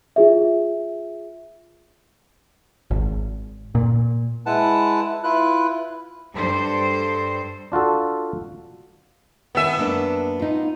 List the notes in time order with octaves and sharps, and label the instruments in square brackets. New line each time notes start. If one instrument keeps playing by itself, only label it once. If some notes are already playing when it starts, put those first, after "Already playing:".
[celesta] F4 G#4 E5
[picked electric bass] G#1
A#2
[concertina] G#3 E4 B4 F#5 A5
E4 F4 B4 F#6
[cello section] G2 A4 C5
[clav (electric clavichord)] D4 F4 F#4 A4
[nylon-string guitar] D#3 G#5 [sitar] B3 E5
[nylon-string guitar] F#2 A#3 D4
D#4 F4